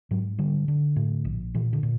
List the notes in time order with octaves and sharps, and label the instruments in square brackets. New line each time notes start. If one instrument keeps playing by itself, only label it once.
[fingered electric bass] G#2 F#3
D3 G3
D3
A2
A#1
A#2 E3
D3
A#2